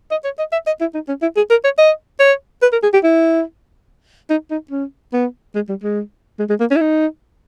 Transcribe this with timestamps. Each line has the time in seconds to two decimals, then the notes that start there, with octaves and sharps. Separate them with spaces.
0.11 D#5
0.24 C#5
0.39 D#5
0.52 E5
0.67 D#5
0.81 E4
0.94 D#4
1.08 C#4
1.22 E4
1.37 G#4
1.50 A#4
1.64 C#5
1.78 D#5
2.20 C#5
2.62 B4
2.72 A#4
2.83 G#4
2.93 G4
3.04 E4
4.30 D#4
4.51 D#4
4.71 C#4
5.13 B3
5.55 G#3
5.69 G3
5.83 G#3
6.39 G#3
6.49 G#3
6.60 A#3
6.71 C#4
6.76 E4
6.81 D#4